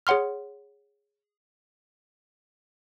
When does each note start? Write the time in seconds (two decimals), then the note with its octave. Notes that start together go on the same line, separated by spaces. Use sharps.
0.07 G#4 C#5 F#5 C6 F6